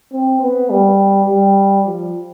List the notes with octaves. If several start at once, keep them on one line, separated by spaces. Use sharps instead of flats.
C4
B3
G3
G3
F3